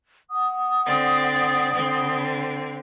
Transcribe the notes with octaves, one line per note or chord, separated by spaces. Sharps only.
F#5 D#6
D3 C4 D5
D3 C4